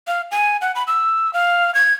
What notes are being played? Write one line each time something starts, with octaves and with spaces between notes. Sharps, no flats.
F5
G#5
F#5
B5
E6
F5
G#6